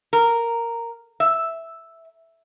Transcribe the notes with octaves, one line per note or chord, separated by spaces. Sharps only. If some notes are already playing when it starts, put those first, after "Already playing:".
A#4
E5